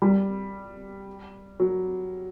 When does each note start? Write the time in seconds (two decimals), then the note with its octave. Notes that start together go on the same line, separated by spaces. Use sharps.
0.02 G3
1.60 F#3